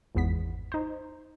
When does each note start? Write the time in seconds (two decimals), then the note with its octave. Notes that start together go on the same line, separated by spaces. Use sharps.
0.15 G#1 E2 B3 B6
0.72 D#4 C5